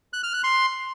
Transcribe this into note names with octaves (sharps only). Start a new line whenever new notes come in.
F#6
F6
F#6
C6